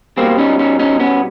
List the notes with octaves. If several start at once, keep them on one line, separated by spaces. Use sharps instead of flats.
B2 G3 A#3 C4
C#4 D#4
C#4 D#4
C#4 D#4
B3 C#4